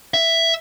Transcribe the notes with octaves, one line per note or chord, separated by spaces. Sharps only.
E5